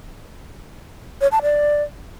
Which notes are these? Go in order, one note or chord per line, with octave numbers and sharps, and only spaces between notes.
C#5
A5
D5